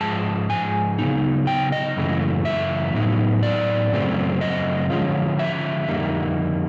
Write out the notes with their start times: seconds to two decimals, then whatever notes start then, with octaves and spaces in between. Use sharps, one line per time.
0.01 G#2 F3 G#3 A5
0.50 G#5
0.99 C#3 F#3 B3 D#4
1.47 G5
1.72 D#5
1.97 F#2 C#3 E3 A3
2.45 E5
2.94 A2 F#3 B3 D#4
3.43 D5
3.92 F#2 C#3 F#3 A3 C4
4.41 D#5
4.90 D3 F3 G#3 C#4 F4
5.39 E5
5.88 F2 D3 G3 A#3 D#4